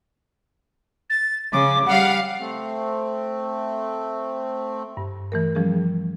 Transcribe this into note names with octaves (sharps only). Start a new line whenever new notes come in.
A6
C#3 D6
G3 F5 F#5
A3 C4
G2
E3 A3 A#4
E3 F3 G3 C#4 G#4